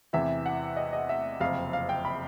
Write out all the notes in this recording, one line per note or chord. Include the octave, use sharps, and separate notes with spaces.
E2 C3 E3 E5
F#5
D#5
D#5
E5
F#1 F2 C3 F5
F5
G5
B5